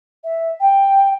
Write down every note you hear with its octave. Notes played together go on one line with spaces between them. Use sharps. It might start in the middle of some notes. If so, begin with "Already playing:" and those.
E5
G5